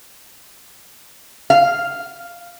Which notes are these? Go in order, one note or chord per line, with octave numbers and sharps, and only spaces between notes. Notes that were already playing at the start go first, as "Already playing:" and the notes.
F5